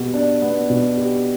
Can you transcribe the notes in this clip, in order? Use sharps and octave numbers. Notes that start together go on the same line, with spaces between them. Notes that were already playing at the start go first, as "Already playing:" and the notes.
Already playing: B2 G4
D4
B3
B2
G4